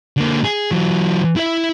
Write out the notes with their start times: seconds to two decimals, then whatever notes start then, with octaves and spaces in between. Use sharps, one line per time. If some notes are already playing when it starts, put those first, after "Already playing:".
0.17 D3 A#3
0.45 G#4
0.71 E3 F#3
1.37 E4 E5